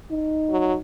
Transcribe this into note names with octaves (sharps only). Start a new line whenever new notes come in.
D#4
F#3